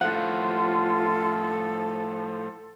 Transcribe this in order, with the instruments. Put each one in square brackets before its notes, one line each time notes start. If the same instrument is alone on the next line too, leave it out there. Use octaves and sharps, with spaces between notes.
[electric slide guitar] A2 F3 [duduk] F4 [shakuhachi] A4 [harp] F#5